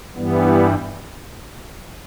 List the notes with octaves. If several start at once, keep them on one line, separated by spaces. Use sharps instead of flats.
G2 E3 G3 B3